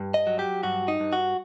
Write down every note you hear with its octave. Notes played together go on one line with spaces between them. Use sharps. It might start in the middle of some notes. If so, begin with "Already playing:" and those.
Already playing: G2
D#5
F#3
G4
G2 F#4
D#4
G2
F#4